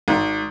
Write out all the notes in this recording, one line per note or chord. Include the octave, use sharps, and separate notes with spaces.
G#1